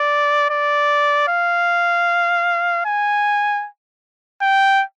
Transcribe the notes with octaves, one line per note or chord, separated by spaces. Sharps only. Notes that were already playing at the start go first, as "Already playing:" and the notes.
Already playing: D5
D5
F5
G#5
G5